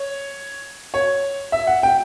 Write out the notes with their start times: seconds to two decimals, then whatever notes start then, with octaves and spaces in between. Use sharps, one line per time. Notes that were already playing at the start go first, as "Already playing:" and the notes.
Already playing: C#5
0.94 C#5
1.52 E5
1.67 F#5
1.83 G5